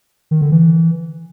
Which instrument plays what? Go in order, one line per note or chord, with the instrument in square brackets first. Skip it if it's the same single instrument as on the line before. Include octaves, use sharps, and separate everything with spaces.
[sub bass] D#3
D3
E3